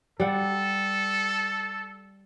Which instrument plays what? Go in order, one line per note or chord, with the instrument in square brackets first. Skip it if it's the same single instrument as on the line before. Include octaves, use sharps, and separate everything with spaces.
[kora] G3 F#5 [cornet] A4